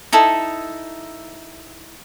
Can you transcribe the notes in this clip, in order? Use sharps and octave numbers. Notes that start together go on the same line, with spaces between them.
D#4 E4 A4